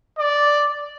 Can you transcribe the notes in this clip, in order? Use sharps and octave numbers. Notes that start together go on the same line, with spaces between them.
D5